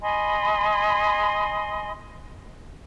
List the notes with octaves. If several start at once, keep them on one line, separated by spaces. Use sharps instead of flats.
D#5 G#5 B5 C6